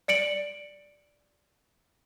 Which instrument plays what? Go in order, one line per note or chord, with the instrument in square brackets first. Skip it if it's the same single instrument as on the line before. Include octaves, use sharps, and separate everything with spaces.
[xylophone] D5 C#7 D7 F#7